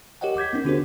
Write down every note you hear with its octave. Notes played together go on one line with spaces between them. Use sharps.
G4 A#4 C#5 D#5 F#5 G5
D6 G6 G#6 B6
B3 C#4 D#4 A#4
D3 D4 F#4 G#4 A#4 C5